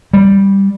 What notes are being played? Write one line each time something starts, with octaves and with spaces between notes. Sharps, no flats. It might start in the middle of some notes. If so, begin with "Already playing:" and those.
G3